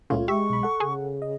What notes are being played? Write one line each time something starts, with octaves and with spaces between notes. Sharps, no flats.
C#2 A#2 C#3 A3 F4 C#5
G#3 G4 E5 C#6
B1 B5
A4 F#5
C#3 G#4
D#5